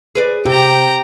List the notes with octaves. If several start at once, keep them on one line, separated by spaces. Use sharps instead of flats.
G#4 B4 D5
C3 G4 G5 A#5